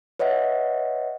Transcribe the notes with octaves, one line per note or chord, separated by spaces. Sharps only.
B4 C#5 D#5 E5 F#5